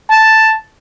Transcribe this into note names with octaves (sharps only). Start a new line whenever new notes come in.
A5